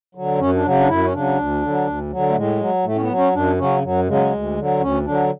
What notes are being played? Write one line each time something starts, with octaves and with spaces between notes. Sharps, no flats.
D3 F#3
F#2 C#4
D4
C#3 F#3
D4
F#2 E4
C#4
C#3 F#3 D4
D2
D3 F#3
D2
D3 F#3
A3
A2 G#3
F#3
A2 A3
C#4
B3
F#3
C#4
F#2 D4
C#3 F#3 C#4
F#2 F#3
C#3 F#3 G#3
D2
D3 F#3
D2 C#4
D3 F#3 D4